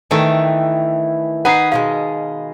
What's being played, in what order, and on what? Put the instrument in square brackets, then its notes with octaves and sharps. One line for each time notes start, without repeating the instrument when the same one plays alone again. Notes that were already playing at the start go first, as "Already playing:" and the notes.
[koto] D#3 A3 [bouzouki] E3 E5 G5
[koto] D#4 D#5 G#5 [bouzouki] B4 [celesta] F#5 C7
[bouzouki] B2 E3 G#3 [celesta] F5